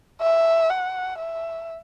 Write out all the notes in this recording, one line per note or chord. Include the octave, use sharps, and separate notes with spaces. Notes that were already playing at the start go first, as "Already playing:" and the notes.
E5
F#5
E5